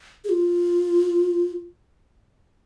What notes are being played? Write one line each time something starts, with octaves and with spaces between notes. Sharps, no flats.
G#4
F4